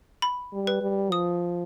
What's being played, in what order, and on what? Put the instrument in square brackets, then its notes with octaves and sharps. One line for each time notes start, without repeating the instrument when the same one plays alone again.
[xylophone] B5
[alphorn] G3
[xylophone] B4
[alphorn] G3
[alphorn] F3 [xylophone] D#6